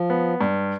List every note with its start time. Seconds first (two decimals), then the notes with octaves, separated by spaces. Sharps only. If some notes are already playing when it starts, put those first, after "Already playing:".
Already playing: F3
0.10 B3
0.41 G2